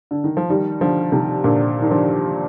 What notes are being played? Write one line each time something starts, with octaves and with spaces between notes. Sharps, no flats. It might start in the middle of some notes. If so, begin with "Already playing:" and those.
D3
D#3
F3
D#3 G3
D3 F3
C3 D#3
A#2 D3
D#3
D3 F3